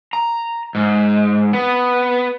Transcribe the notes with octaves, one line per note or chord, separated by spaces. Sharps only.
A#5
G#2
B3